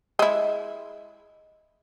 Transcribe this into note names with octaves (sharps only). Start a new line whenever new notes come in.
G#3 E4